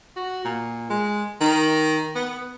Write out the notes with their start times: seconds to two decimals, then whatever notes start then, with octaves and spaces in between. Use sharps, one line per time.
0.16 F#4
0.45 A#2
0.90 G#3
1.41 D#3
2.15 B3